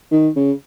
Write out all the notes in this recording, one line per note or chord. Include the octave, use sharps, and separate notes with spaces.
D#3
C#3